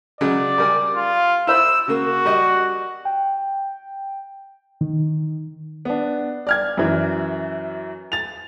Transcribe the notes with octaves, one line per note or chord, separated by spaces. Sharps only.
C#3 F#3 G#3 D5
G3 A#4 G#5
F4
E4 C5 B5 E6
C#3 A#3 F#4
G3 D#5
G5
D#3
B3 D4
D5 F6 G#6
F#2 E3
A6 F7